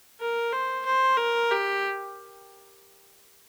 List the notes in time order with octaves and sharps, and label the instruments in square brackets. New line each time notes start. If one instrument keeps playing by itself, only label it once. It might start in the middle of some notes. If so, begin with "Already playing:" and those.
[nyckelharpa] A#4
C5
C5
A#4
G4